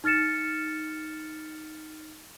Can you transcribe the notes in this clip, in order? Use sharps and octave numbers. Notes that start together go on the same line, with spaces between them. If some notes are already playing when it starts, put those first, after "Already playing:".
D#4 F6 A6 C#7 E7